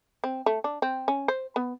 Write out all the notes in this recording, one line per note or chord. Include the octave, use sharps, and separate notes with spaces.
C4
A3
D4
C4
C#4
C5
B3